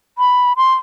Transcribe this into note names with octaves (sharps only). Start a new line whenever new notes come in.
B5
C6